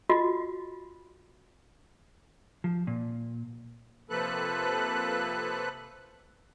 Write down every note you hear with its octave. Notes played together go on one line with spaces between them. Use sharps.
F4 F#4 D#5
F3
A#2
C3 F3 A#3 A4 B4 F#6